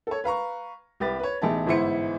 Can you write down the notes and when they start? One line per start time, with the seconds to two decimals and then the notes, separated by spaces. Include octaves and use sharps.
0.07 A4 C#5
0.24 B4 F5 A#5 C#6
1.00 C2 G4 B4 A6
1.19 B4 C#5
1.42 A1 B2 D#4 G#4 E5 A5
1.66 G1 G#2 E3 E4 C5 C#7